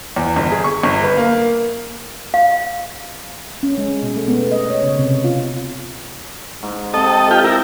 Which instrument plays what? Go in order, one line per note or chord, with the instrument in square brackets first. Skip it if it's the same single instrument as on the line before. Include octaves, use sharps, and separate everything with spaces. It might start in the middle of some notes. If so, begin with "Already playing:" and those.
[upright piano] E2
G1
G#4
C#6
G1
B4
A#3
[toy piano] F5
[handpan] C#4
G#3
B2
A3
B3
D#5
C#5
C#3
C3
F4
[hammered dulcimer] G#2
[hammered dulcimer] C3 C4 [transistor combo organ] A4 D#5
[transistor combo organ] F4 G4 G5
E4 A#4